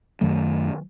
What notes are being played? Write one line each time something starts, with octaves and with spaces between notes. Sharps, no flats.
F#2 D#3 F#3 A3